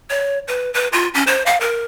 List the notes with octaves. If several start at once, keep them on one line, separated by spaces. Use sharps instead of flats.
C#5
B4
B4
F4
C#4
C5
F5
A#4